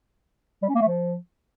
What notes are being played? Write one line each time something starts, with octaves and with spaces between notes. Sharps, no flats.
G3
C#4
A#3
A3
F3